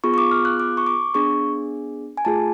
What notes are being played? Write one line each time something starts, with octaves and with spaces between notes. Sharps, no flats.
B3 F4 G#4 C#6
C#6
D6
F6
F#6
D6
C#6
D6
B3 D4 G#4 C#6
G#5
A3 F4 G#4 A5